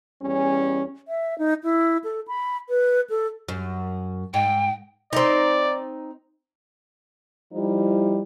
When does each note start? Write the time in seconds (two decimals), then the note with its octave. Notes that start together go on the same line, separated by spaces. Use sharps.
0.22 E2 G3 C#4
1.08 E5
1.39 D#4
1.64 E4
2.04 A4
2.28 B5
2.69 B4
3.10 A4
3.48 F#2
4.34 G#2 G5
5.13 C4 D#4 D5
7.53 F3 G3 D#4 E4